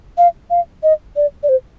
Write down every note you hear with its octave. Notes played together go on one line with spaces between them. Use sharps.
F5
F5
D#5
D5
D5
C5